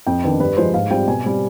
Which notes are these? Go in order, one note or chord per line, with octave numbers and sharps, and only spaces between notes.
F2 G5
D#3 B3 D4
G2 B4
F3 G#3 C5
G#2 F5
G3 C4 F4 G5
B2 G#5
G3 C4